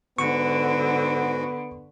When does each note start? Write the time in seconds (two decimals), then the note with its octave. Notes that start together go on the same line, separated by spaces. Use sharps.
0.19 G#2 D3 B3 F#4 C#6